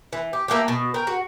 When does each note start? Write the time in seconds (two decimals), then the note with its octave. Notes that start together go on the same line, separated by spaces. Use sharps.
0.13 E3
0.33 G4
0.48 A3 A#3 C#4 G4
0.68 B2
0.94 A#4 G5
1.07 F#4